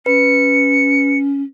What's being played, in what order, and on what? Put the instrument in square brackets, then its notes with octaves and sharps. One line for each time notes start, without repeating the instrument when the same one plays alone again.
[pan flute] C#4 [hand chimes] B4 [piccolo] C#7